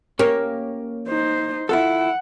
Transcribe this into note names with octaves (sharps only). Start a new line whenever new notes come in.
A#3 C#4 G4 C#5
D#4 C5
E4 F4 A4 F#5